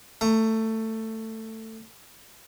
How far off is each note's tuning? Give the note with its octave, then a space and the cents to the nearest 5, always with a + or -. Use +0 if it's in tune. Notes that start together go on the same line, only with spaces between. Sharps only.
A3 +15 A#5 -10